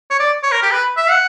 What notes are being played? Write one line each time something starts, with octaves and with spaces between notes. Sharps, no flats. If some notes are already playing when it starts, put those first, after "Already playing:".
C#5
D5
C#5
A#4
G4
B4
E5
F#5